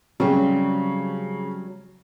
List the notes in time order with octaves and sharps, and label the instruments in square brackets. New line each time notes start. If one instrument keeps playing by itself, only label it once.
[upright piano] C#3 [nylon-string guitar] F#3 G3 C4